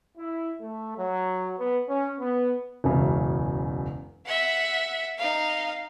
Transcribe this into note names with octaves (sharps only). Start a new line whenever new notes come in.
E4
A3
F#3
B3
C#4
B3
E1 C#2 F#2 C#3
E5 F#5
D#4 F5